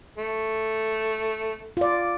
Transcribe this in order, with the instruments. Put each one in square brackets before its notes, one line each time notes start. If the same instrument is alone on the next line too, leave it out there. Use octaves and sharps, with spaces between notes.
[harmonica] A3
[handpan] F4 D5